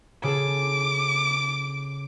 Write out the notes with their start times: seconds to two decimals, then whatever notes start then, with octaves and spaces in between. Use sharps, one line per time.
0.23 C#3 G#4 A4 D6